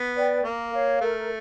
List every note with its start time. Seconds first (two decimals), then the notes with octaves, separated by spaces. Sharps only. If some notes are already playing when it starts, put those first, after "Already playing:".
Already playing: B3
0.15 B4 D5 G5
0.43 A#3 A#4
0.72 C#5 F5
1.00 A3 A#4